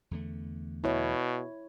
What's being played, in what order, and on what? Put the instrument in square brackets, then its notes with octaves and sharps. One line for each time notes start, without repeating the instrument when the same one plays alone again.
[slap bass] E2 D3 A3
[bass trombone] B2 [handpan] E4 C#5